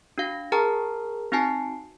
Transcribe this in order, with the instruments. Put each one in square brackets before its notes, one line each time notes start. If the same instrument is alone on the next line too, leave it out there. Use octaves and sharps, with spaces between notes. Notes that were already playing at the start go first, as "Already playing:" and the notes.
[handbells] D4 F#4 F5
G#4 A#4 G5 A5 A#5 F6
C4 D#4 F#4 G#5 A5 C7